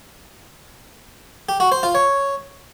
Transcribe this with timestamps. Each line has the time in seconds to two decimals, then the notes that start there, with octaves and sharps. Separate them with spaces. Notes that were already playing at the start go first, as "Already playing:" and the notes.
1.49 G4
1.60 F#4
1.72 C5
1.83 F4
1.95 C#5